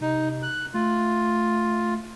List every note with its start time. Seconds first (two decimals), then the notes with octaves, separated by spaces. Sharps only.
0.01 C3 D#4
0.43 F#6
0.74 A3 F4